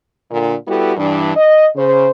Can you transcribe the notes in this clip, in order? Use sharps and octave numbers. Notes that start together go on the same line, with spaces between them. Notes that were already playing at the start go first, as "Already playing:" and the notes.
A#2 D3
G3 B3 E4 F#4 G4 A4
G2 E3 D4
D#5
C#3 C5